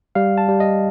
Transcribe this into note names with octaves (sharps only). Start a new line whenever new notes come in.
G3 F5
A5
G3
D#5